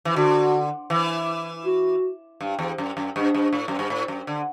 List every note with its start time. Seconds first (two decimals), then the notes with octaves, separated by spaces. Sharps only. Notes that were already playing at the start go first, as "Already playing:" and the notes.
0.05 E3
0.16 D3 F#4
0.90 E3
1.65 F#4
2.41 G2
2.59 E2
2.78 F#2
2.97 F#2
3.15 G2 D4
3.35 G2
3.53 A2
3.68 F#2
3.79 G2
3.90 A2
4.08 F#2
4.27 D3